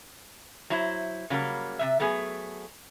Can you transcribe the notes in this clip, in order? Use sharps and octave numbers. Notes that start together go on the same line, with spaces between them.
F#3 E4 C5
C#3 F#3 G3 A#3
C3 G3 E5
F#3 A3 B3 G#4